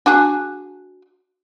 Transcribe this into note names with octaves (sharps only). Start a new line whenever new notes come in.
D4 F#4 G#4